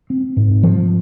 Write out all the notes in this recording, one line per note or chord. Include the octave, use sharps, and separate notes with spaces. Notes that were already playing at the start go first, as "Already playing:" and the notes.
C4
G#2
F3